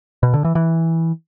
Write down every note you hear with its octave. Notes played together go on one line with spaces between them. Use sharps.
B2
D3
E3
E3